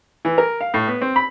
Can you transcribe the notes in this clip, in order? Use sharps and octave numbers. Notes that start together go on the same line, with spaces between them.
E3
A#4
F5
A2
B3
C4
B5